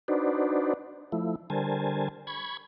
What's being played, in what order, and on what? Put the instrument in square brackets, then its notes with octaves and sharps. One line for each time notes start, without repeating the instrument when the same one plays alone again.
[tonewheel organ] D4 D#4 F#4 B4 C5 D5
F3 A3 E4
D3 G3 A#4 C5 G#5 A5
B5 C#6 G#6